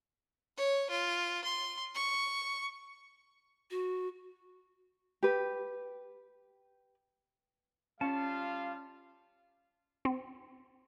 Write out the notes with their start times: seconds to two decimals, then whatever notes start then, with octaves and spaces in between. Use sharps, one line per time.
0.57 C#5
0.90 F4
1.44 C6
1.95 C#6
3.71 F#4
5.23 G4 B4
8.01 G3 C#4 F4 C#5 F5 A5
10.05 C4